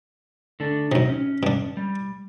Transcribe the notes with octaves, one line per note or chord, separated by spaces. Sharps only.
D3 A3 D4
F#2 C3 D#4
C#4
G2 D4
G3